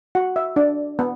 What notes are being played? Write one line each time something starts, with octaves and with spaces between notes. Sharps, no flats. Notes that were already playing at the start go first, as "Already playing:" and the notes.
F#4 F#5
E5
D4 D5
B3